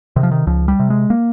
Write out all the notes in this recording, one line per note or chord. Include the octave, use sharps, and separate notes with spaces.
C3 D#3
F3
D#3
C#2 F3
G3
C3
G#3
A#3